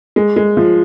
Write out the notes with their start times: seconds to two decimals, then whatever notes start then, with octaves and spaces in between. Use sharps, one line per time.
0.16 G#3
0.36 G#3
0.57 F3